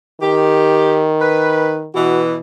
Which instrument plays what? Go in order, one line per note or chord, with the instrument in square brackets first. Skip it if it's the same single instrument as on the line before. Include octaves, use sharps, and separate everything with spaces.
[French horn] D#3 [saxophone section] G4
[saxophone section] B4
[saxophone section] B2 E3 [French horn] F#4